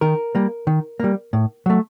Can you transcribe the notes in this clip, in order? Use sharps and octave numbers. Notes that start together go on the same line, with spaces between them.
D#3 A#4
G3 A#3
D#3
G3 A#3
A2
F#3 A3